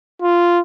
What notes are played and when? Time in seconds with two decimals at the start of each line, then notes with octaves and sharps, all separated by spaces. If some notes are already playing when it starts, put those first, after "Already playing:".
0.22 F4